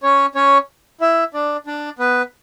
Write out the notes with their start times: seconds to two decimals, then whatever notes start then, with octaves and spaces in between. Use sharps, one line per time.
0.03 C#4 C#5
0.35 C#4 C#5
1.01 E4 E5
1.34 D4 D5
1.67 D4 D5
1.99 B3 B4